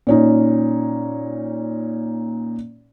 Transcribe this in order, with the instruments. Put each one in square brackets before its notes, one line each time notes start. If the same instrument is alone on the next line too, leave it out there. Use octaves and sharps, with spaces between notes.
[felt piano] A#2 C#4 D#4